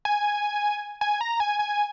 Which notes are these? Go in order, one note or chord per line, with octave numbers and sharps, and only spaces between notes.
G#5
G#5
A#5
G#5
G#5